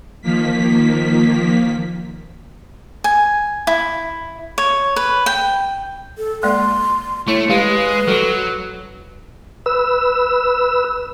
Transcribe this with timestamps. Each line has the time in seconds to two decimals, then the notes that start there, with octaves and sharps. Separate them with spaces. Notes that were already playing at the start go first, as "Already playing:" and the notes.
0.22 D#3 F3 A#3 B6
3.04 G#5
3.67 E4
4.58 C#5
4.96 B4
5.26 G5
6.18 A4
6.43 G#3 A#3 D5 C6
7.28 A3 E4 C#5
7.50 G#3 G4 B4 F5
8.08 F#3 F#4 A4
9.66 B4 E6